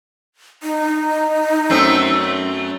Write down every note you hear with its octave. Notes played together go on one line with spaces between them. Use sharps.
D#4
F#2 A3 C4